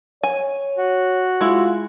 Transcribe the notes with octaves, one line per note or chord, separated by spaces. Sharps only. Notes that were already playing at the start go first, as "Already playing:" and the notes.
C#5 G#5
F#4
G#3 E4 F4